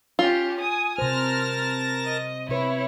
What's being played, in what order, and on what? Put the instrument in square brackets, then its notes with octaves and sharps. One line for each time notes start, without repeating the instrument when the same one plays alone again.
[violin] C#4 G4 [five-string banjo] F4
[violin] G#5 D#6
[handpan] C3 C5 [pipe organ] A#4 A5 A#6 [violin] F6
[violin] D#5
[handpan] C3 B4 [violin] E4 C#5